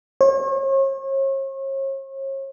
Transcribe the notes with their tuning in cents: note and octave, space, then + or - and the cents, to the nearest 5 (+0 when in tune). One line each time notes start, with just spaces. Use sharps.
C#5 -40